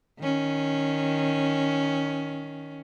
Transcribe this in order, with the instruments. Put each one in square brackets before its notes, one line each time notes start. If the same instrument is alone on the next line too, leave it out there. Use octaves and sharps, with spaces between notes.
[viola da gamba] D#3 C#4